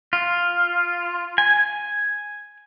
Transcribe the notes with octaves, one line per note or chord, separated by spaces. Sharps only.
F4
G#5